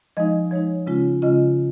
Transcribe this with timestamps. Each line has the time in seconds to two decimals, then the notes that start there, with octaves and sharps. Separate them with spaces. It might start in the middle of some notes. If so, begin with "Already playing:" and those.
0.17 F3 G#3 D#4 D#5
0.51 F3 G#3 D#4 C#5
0.87 C#3 G#3 C#4 F4
1.22 C#3 G#3 C#4 F4 D#5